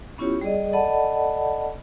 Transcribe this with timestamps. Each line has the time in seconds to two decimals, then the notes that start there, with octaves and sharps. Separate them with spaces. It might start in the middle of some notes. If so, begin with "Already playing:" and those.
0.18 B3 C#4 E4 F4 G4 C#5
0.41 G3 G#4 D5 D#5
0.73 A4 D5 D#5 F#5 A5 B5